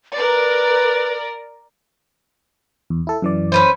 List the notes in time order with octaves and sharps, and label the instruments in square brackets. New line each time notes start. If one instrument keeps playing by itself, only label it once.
[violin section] A#4 D5 [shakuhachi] B4
[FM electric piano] E2
E4 A4
F#2 E3 D5
[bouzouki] C#4 B4 C5